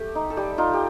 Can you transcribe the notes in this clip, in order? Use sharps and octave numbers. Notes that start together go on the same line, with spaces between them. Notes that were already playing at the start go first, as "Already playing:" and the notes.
Already playing: A3 G4
D#4
A4
G3 G4
D#4 F4
G4